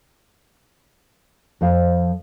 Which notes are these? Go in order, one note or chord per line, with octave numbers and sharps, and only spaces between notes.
F2 F3 C5 F5